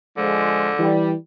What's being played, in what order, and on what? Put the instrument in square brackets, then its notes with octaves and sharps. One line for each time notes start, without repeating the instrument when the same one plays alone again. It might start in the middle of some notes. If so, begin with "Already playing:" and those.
[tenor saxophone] D3 [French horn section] F3 G#3
[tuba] E3 [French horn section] G3